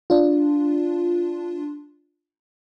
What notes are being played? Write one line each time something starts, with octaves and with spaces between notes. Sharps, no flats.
D4 F4